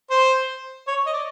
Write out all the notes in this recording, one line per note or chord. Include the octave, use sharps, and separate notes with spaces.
C5
C#5
D#5
D5